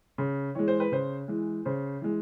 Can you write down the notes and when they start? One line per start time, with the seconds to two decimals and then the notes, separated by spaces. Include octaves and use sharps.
0.18 C#3
0.55 E3 G#3 C#5
0.68 C5
0.80 B4
0.92 C#3 C5
1.28 E3 G#3
1.65 C#3 C5
2.02 E3 G#3